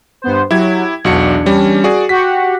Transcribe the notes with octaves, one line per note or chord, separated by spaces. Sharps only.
G2 B3 C5
F#3 E4 G4 G#6
B1 E2 D4 F#4 C#7
G3 C#4
F#4 G#4 D5
F#4 G4 F#5 B6